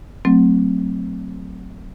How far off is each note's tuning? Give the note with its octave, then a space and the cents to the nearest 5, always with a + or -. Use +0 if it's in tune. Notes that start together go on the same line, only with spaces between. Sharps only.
F#3 +0 A3 +20 C4 +0